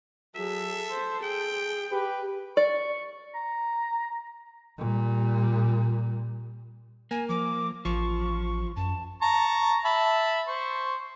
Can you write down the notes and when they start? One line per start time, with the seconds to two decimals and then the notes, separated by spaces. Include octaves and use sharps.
0.35 F#3 G#4 A4 E5
0.91 C5
1.23 G#4 G5
1.92 G4 B4
2.57 D5 C#6
3.35 A#5
4.78 A#2 G3
7.11 A#3 G#5
7.29 F3 D6
7.85 A1 F3 C#6
8.76 F#2 A5
9.22 A5 A#5 C#6
9.85 E5 A5 B5
10.48 C5 C#6